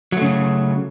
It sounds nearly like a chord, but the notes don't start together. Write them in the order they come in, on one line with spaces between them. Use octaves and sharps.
F#3 A3 C#3